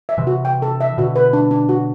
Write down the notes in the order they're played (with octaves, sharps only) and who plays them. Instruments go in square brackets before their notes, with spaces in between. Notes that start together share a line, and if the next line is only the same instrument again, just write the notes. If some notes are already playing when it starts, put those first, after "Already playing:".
[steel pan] E5
[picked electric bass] C3 E3
[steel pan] F#4
G5
A4
E5
[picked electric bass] B2 D3 [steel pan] F#4
[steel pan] B4
D4
D4
F#4